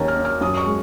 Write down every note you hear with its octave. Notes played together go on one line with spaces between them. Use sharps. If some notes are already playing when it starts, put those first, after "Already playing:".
Already playing: D#2 D#3 C#4 A#5
F6
C#4
F6
F#2 D#6
C#6
G#3